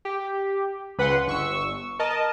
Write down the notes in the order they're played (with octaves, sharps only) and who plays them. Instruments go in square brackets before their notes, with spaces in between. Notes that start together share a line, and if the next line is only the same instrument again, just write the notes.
[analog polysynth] G4
C#2 B4 F#5 C6
G1 C#6 E6
A#4 D#5 A5